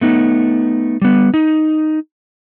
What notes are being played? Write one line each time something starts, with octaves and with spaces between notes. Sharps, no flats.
A3 B3 D#4
G3 B3
D#4